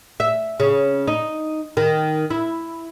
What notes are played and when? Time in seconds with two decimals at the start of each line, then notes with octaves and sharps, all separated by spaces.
0.20 E5
0.60 C#3
1.08 D#4
1.77 D#3
2.30 E4